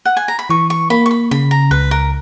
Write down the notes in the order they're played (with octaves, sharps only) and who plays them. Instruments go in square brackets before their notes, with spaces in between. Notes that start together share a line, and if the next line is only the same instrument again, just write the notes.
[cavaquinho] F#5
G#5
A#5
B5
[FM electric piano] E3 [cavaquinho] C#6
[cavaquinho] C#6
[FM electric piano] A#3 [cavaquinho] B5
[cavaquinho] C#6
B5
[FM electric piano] C#3 [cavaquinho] B5
[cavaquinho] A#5
[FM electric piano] C#2 [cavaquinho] B4
[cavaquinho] A#4